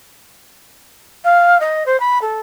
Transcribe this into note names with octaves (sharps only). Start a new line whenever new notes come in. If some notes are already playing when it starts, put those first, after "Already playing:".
F5
D#5
C5
B5
A4